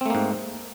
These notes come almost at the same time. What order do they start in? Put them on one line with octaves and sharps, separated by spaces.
C4 A3 A#3 G#2